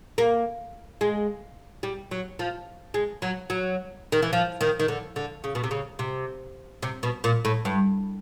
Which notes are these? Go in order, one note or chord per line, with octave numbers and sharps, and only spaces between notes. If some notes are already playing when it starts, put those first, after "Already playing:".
A#3
G#3
G3
F#3
F3
G#3
F#3
F#3
D#3
E3
F3
D#3
D#3
D3
D3
C#3
B2
C3
C#3
C3
C3
B2
A#2
A2
G2